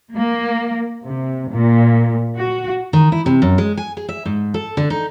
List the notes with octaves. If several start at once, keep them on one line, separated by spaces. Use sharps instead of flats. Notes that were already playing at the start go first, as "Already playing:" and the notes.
A#3
C3
A#2
F#4
D#3
E4
C3
F#2
G#3
G#5
G#4
E5
G#2
A4
D3
D#4